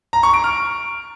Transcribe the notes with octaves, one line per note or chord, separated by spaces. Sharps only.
A#5
C#6
D7
F6